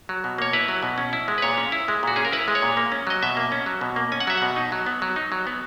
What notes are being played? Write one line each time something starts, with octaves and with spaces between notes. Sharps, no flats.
F#3
B2
A#3 C#5
E4 B4
F#3
B2
C#4
E4
G#3
B4
A#2 C#5
C#4
E4
G#3
A#2 F#4
C#4 G#4
A#4
E4 B4
G#3
C#5
A#2
A#3
C#4
F#3 D#5
B2 E5
A#3
C#4
F#3
B2
A#3
C#4 G#5
F#5
F#3 E5
B2 F#5
D#4
F#3
B3
F#3
D#4
F#3
B3